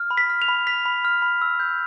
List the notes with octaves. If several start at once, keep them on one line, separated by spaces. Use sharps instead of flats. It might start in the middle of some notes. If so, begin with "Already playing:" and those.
Already playing: F6
B5
B6
F6
F7
B5
F6 B6
B5
F6
B5
E6
G6